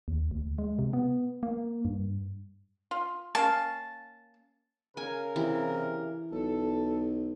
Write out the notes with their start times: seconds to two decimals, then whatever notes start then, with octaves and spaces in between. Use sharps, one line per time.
0.08 D#2
0.31 D2
0.58 G#3
0.79 C3
0.93 B3
1.43 A#3
1.85 G2
2.91 F4
3.35 A#3 C#4 F5 A5
4.97 C#3 A#4 G#5
5.36 C3 E3
6.32 B1 A4